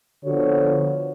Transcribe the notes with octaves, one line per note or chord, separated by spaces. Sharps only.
D3 F3 B3 F#4 C#5